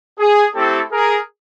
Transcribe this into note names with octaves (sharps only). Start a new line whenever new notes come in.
G#4
A3 C4 E4 G4 A4
G#4 A#4